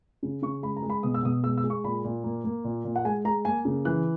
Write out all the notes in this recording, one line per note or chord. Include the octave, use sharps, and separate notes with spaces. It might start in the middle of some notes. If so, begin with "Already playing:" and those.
C#3
C#3 C#6
G#3 B5
A#5
G#3
B5
B2 D#6
E6
B2 D#6
G#3 E6
E6
G#3
C#6
A#2 B5
A#2
A#3
A#3
A#2
A#2
F#5
G#3 G#5
G#3 A#5
A#3 G#5
C#3
E3 F#6